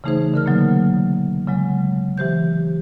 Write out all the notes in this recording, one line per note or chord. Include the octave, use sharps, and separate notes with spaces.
C#3 E3 A3 D#4 G#4 C5
D3 A#4 F6
B2 D3 F#3 A3 A#3
C#3 F#3 G#3
E3 G4 C5 G6